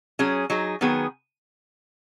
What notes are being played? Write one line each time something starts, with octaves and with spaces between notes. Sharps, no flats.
F#3 C#4 G#4
F#3 D#4 G#4
D#3 F#3 B3 G#4